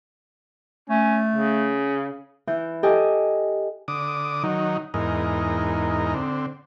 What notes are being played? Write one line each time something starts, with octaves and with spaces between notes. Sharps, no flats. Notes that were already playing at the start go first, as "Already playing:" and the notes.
A3 C#4
C#3
E3 E4 G6
G4 A4 D#5 G5 G#5
D3 D6 D#6
D#3 F#3 D#4
E2 G#2 D#4 A#4
D3 C4